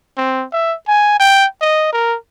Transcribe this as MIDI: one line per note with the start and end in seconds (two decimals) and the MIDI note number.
0.18 0.45 60
0.52 0.75 76
0.88 1.16 80
1.20 1.45 79
1.61 1.89 75
1.93 2.15 70